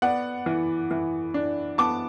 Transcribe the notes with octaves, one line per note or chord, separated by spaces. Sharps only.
B3 D5 F#5
E3
E3
D4
B3 A5 D6